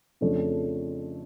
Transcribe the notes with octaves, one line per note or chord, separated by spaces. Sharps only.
F2 C#3 F3 A3 D4